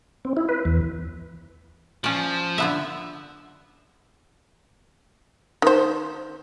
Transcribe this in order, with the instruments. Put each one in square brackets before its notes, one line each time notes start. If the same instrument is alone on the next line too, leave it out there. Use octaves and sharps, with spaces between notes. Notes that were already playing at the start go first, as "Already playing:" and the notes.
[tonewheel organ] C4
E4
B4
E2
[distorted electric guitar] F3 [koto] C#4 D5
[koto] D3 B3 E5
[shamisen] D#3 C5